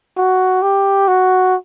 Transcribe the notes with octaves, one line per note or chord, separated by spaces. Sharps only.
F#4
G4
F#4